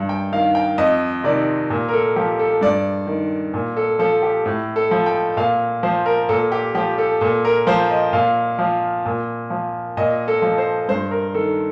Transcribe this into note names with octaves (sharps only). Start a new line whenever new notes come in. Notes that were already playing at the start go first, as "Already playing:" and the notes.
Already playing: G2
G5
D#3 F5
G5
F2 D#5
C3 D#3 D5
A#2
A#4
A4
F3 G4
A4
G2 D5
D#3
A#2
A4
F3 A4
G4
A2
A4
F3
G5
A#2 F5
F3 C5
A#4
A#2 A4
G4
F3 G4
A4
A#2 A4
A#4
F3 C5
D#5
A#2 F5
F3
A#2
F3
A#2 D#5
A4
F3
C5
G2 C5
A#4
D#3 A4